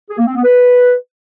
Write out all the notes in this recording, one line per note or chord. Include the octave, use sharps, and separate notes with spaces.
G#4
A#3
C4
B3
B4